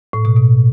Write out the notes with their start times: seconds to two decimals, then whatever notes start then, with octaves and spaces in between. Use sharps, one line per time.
0.13 A2
0.25 B2
0.36 B2